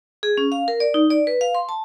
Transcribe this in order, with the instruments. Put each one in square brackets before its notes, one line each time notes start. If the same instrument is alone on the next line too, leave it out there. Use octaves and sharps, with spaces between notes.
[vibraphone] G#4
C#4
F5
A#4
D5
D#4
D5
B4
F5
C6
A5